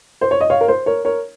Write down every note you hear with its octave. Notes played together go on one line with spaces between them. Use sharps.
C5
C#5
D#5
C#5 F5
A#4
C5
A#4 C#5
A#4 C#5